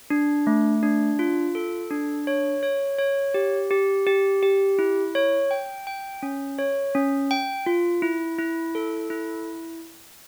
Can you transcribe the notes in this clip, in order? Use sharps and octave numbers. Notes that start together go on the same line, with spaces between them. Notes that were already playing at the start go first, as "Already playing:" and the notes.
D4
A3
D4
F4
A4
D4
C#5
C#5
C#5
G4
G4
G4
G4
E4
C#5
G5
G5
C#4
C#5
C#4
G5
F4
E4
E4
A4
E4